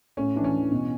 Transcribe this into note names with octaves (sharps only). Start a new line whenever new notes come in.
A2 C#4
E3 D4
C#4
E3
B2